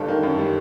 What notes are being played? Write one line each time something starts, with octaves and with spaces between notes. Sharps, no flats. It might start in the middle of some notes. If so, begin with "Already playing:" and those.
Already playing: G1 G2 A4
D#3
F#2
G3